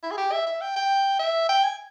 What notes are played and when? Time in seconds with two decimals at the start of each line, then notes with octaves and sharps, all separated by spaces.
0.03 E4
0.11 G#4
0.18 G4
0.32 E5
0.47 E5
0.61 G5
0.76 G5
1.19 E5
1.49 G5
1.63 G#5